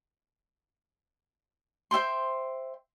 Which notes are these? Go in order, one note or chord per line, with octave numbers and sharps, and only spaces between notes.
C5 E5 G5 C6